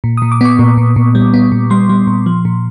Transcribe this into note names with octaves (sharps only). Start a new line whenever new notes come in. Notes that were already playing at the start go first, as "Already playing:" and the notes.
A#2
A#2 D#6
D6
B3 C#6
A#2
A#2
A#2
G3
B3
A#2
G3 C6
G3
A#2
F3
A#2